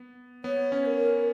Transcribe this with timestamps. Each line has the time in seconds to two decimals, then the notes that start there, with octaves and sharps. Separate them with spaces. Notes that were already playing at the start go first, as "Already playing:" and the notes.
Already playing: B3
0.44 B3 C#5
0.72 C#4
0.86 A#4